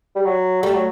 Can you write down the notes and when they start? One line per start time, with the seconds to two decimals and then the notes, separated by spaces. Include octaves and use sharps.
0.16 G3
0.26 F#3
0.63 G3 A3
0.74 F#3